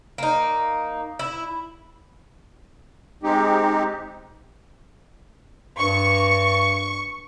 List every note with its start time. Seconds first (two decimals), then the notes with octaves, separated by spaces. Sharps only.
0.18 A#3 D#4
1.19 E4
3.23 G#3 C4 D#4 G4
5.79 G2 C#6